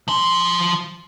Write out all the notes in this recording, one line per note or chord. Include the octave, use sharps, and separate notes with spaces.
F3 C6